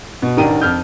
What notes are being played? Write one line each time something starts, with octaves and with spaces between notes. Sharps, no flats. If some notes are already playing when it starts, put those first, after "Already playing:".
B2
A1 D#3 D4 A#4 G5 D#7
F2 F6 G6